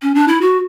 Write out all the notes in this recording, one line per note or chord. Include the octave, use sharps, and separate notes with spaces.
C#4
D4
E4
F#4